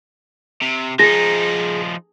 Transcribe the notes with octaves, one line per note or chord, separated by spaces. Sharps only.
C3
F3 D#4 G#4 A#6